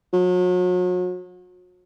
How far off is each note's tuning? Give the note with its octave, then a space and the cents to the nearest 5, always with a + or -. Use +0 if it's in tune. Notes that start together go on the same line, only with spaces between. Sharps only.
F#3 -40